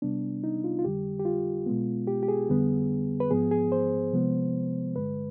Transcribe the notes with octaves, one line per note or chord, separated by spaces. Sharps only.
C3 G3 B3 D4
D#4
F4
F4
F2 D3 G3 G4
G4
F4
B2 G#3 B3
G4
G4
G#4
F2 D3 G3 B3
B4
G#2 F3 B3 G#4
G#4
C5
C3 F3 G#3 B3
G2 D3 G#3 B4